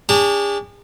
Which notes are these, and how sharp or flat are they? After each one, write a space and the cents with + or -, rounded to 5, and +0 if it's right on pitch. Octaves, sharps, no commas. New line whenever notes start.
D4 -35 G#4 -40 A5 +35